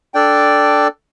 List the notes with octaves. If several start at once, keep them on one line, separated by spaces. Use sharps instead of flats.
D4 A4 D5 G5